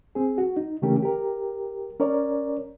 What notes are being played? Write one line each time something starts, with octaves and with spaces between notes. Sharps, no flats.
C4 G#4
F#4
D#4
C#3 E3 A3 C#4 G4 A#4
G4 A#4
C#4 A#4 C#5 D5